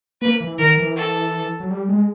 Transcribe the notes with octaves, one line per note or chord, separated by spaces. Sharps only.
A#3 B4
E3
D#3 A#4
E3
A4
F#3
G3
G#3